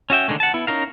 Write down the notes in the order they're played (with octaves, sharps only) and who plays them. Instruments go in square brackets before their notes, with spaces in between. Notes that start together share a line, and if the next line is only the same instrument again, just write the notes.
[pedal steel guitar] C#4 F#4 E5 G5
D3 D#3 G#3 A3
F#5 A5
B3 E4
C#4 D#4 A#4 F5